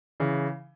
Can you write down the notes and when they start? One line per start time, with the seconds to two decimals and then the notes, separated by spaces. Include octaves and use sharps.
0.20 C#3 E3